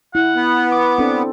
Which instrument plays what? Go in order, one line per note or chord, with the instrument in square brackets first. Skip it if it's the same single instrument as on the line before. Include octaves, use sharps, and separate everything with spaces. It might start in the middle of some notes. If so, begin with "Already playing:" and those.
[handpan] E4 [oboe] F#5
[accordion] B3
[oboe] D6
[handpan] C4 D4 A4